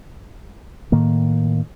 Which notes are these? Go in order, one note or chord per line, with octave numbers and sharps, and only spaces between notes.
A2 D#3 A#3